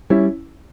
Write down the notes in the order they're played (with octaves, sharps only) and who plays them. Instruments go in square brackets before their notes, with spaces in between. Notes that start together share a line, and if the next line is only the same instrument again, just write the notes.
[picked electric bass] G3 [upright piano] C#4 E4